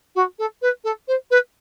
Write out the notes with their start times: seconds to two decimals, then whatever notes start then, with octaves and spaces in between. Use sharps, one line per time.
0.15 F#4
0.39 A4
0.62 B4
0.84 A4
1.08 C5
1.31 B4